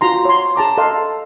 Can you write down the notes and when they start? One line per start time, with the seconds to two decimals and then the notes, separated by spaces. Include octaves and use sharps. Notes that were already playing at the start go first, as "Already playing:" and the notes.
0.01 F4 F#4 A#5 C6
0.25 C#5 C6
0.56 G#4 A5 A#5 D6
0.78 A4 D#5 F5 C6